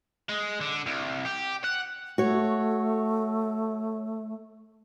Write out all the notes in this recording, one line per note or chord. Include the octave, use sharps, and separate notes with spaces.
G#3
D3
C2
G4
F#5
A3 F#4 C#5